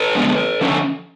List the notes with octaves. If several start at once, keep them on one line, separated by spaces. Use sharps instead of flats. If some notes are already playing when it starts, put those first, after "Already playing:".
Already playing: A4 B4
D3 F3 G#3 B3
D3 F3 A3 C#4